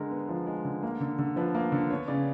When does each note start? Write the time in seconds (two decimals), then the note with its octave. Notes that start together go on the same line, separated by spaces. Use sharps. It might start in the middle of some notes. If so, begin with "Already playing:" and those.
Already playing: D3 G#3 A#4
0.11 B3
0.29 F3
0.47 G#3
0.65 D3
0.83 A#3
1.01 D3
1.19 D3
1.36 F3 B4
1.55 A#3
1.72 D3
1.90 B3 C#5
2.08 C#3 D5